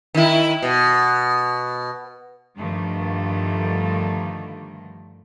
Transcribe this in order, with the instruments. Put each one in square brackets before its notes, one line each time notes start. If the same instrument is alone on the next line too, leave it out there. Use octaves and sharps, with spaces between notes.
[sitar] D#3 E4
B2
[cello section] G2 D3 D#3 F3 G3 A3